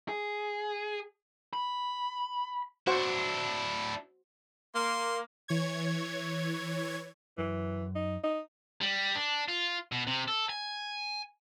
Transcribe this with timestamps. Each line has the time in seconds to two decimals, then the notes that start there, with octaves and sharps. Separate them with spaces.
0.09 G#4
1.53 B5
2.87 D4 E4 F#4 C5 F#5
4.75 A#3 C6
5.48 E3 C#5 G#6
7.38 F#2 E3
7.95 D#4
8.24 D#4
8.81 G3
9.15 D4
9.48 F4
9.92 B2
10.07 C3
10.28 A4
10.49 G#5